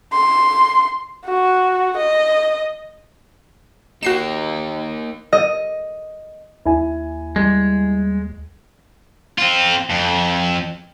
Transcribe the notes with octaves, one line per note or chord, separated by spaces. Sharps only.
C6
F#4
D#5
D#2 A#3 D#4 F#4 C7 E7
D#5
D#2 E4 G#5
G3 G#3
C4 F4
F2